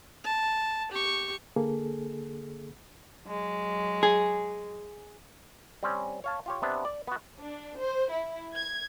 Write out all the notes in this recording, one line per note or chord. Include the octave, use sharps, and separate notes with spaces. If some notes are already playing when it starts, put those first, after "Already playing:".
A5
G4 C#6
D3 A#3 G#4 A4
F#3 G#3
G#4
G3 C4 C#4
C#5 F5 A5
F4 G4 C#5
C3 B3 D4
D5
B3 F#4
D4
C5
E4
G#6